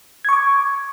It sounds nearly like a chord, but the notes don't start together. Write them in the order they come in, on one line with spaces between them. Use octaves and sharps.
G#6 C#6 D6